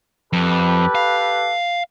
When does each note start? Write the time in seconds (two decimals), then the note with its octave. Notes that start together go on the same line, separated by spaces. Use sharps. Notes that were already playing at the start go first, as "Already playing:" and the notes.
0.33 F2 G4 A4 B4
0.95 F5